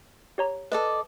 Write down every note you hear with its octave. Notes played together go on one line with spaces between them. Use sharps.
G4 C#5 A#5
A4 B4 D5 D#5